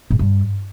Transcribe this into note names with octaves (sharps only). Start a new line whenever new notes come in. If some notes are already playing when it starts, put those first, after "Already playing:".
G#2
G2